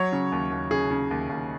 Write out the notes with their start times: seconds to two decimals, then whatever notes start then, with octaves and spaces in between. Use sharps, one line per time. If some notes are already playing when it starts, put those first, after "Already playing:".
Already playing: F#3 C#5
0.12 C#3
0.32 D#2
0.52 D#2
0.71 C#3 G#4
0.91 C#3
1.11 D#2
1.30 D#2